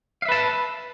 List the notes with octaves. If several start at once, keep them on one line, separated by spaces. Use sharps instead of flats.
B4 E5 F5 A5